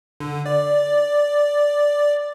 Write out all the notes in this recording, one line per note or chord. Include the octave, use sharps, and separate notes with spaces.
D3
D5